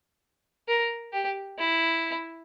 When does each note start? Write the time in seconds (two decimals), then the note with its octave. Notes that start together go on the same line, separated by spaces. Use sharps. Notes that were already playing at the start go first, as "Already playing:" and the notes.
0.68 A#4
1.13 G4
1.58 E4